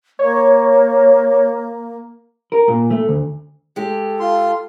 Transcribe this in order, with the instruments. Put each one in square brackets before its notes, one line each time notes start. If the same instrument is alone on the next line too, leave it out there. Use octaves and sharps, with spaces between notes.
[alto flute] A#3 [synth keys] C#5
[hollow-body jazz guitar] A#4
A#2
A3
D2
[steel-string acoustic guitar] G#3 G4 [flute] A4
[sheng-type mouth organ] F4 C6